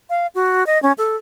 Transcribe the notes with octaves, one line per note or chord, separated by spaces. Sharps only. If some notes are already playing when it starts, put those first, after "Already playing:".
F5
F#4
D#5
C#4
A4